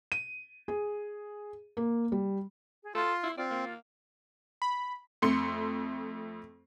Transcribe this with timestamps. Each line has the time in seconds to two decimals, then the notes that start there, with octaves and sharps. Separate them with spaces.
0.12 D#7
0.68 G#4
1.77 A#3
2.12 G3
2.83 G#4
2.95 F4 A4 C6
3.24 E4
3.38 C4 F4 D5
3.51 A#3
4.62 B5
5.22 F2 A3 C6 C#7